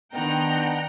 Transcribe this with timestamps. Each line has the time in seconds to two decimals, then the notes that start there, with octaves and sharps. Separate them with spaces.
0.13 D#3 B3 D4 D#4 F#5 G5 A#5